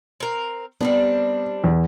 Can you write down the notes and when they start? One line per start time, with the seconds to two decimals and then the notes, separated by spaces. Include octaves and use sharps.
0.20 C4 A#4
0.81 G3 B3 C4 D4
1.64 E2